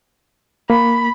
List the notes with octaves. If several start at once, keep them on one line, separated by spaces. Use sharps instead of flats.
A#3 B5